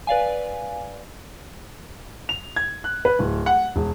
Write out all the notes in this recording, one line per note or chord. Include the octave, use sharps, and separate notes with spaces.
B4 D5 F5 G#5
F7
G#6
F#6
B4
D1
F#5
E1